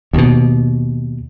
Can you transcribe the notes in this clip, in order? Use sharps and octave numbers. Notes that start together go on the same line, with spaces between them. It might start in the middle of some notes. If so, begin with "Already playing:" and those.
D#2 B2